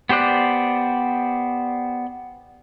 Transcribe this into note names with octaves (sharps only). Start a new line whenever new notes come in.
B3 G4 C5 D5 F#6